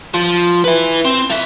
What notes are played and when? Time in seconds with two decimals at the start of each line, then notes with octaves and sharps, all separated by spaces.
0.14 F3
0.64 E4 B4
1.05 C4
1.30 F3 E5